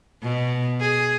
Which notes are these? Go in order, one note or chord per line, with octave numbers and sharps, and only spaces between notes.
B2
G#4